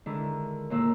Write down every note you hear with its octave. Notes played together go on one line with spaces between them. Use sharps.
D3 D#3 G#3 D4 E4
D#2 A#2 E6